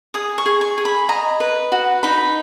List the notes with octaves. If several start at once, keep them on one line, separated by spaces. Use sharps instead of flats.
G#4 D#6
C#6
G#4
C#6
G#4
B5
D#5 A#5
B4
F#4
D#4 B5